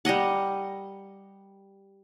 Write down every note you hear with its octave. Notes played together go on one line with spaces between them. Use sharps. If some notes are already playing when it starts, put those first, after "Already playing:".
G3 A#4 D#5 F#5